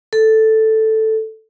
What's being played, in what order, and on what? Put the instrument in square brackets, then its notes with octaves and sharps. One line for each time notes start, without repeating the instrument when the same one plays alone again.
[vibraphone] A4